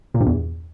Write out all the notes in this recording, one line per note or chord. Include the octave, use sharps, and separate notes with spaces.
A#2
G2
E2